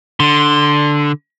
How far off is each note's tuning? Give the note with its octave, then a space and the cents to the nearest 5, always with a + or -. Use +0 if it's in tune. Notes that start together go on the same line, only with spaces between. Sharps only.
D3 +0 C6 +0